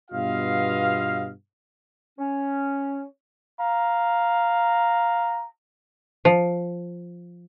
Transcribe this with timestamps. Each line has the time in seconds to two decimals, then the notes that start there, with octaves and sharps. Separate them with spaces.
0.10 G2 B2 B3 F4 D#5 F5
2.19 C#4
3.60 F5 A#5
6.25 F3